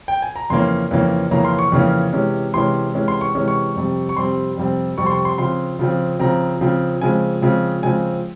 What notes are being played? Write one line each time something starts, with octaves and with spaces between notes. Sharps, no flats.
G5
G#5
A#5
F2 C#3 E3 A#3 C#4 C6
F2 C#3 E3 A#3 C#4
F2 C#3 E3 A#3 C#4 A#5
C6
C#6
F2 C#3 E3 A#3 C#4
C3 E3 G#3 C#4
C3 E3 G#3 C#4 C6
C3 E3 G#3 C#4
C6
C#6
C3 E3 G#3 C#4
C#6
F2 C3 G3 C4
C#6
F2 C3 G3 C4 C6
F2 C3 G3 C4
F2 C3 G3 C4 C#6
C6
C#6
C6
C#3 F3 C4 C6
C#3 F3 C4
C#3 F3 C4 A#5
C#3 F3 C4
C#3 F3 G#3 C4 G#5
C#3 F3 G#3 C4
C#3 F3 G#3 C4 G#5